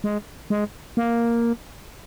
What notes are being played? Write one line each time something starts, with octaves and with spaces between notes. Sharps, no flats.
G#3
G#3
A#3